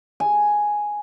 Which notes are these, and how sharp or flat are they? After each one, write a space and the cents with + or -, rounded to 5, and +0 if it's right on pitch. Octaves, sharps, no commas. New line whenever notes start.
G#5 +5